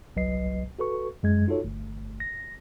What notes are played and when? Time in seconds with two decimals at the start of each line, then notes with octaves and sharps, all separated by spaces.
0.16 G1 C2 F#3 B4 D#5 C7
0.79 F#4 A4 B4 C#6
1.23 F#2 G#3 G#6
1.48 D#4 F4 F#4 A4 C#5
1.65 G1 A3
2.20 A#6